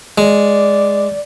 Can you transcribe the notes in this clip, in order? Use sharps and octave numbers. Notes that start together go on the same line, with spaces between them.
G#3 D5